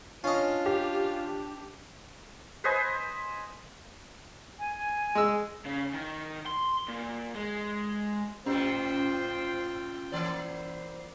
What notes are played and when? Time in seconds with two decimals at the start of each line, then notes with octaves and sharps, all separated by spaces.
0.24 C#4 D4 F4 D#5
0.66 G4
2.64 B4 C5 D#5 G#5
4.59 G#5
5.15 G#3 E6
5.66 C#3
5.94 D#3
6.47 C6
6.88 A#2
7.35 G#3
8.46 A2 B3 C#4 F4 C5 G5
10.12 E3 A#3 C5 D5